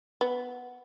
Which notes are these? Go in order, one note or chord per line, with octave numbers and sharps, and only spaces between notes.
B3